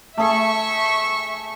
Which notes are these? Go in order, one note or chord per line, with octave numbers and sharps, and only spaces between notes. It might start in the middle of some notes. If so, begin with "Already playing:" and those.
A3 G#4 A4 E5 C#6